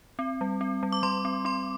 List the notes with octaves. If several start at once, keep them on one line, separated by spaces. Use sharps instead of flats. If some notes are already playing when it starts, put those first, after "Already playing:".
C4
G3
C4
G3
D6
G3 C6
C4
C4 C6